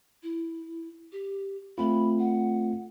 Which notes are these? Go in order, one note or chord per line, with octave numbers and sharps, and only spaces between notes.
E4
G4
A3 C4 F4 B5
F#5